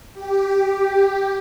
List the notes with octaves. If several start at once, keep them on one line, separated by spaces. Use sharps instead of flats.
G4